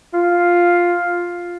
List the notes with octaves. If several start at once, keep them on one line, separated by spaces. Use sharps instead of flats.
F4